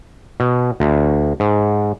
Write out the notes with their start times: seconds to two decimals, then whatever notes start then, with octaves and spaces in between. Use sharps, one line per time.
0.40 B2
0.80 D2
1.40 G#2